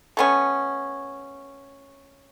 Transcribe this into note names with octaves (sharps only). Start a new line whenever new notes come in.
A3 B3 C#4